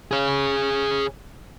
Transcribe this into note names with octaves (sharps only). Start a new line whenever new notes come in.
G#4 C#5